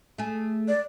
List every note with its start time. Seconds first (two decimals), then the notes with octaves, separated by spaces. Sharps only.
0.18 A3 G#4
0.68 D5